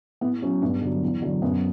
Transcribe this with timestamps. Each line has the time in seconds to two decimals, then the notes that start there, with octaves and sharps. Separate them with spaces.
0.21 A2 B3
0.42 F#3 C#4
0.61 G2 B3 D4
0.82 D3 F#3
1.03 E2
1.22 D3 F#3
1.42 F#2 B3